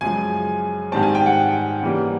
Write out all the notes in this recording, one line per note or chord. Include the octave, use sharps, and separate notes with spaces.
F#2 C#3 F3 G#3 G#5
G#2 D#3 G3 C4 A5
G#5
G5
F#5
C#3 E3 G3 A#3